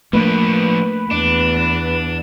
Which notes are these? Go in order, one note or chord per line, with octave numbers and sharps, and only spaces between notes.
F3 A3 A#3 D4 B4
E2 D4